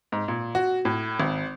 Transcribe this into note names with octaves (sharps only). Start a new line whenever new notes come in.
G#2
A#2
F#4
A2
G#1